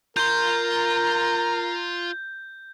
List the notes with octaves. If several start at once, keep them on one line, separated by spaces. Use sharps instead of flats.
F4 A#4 A#5 C6 G6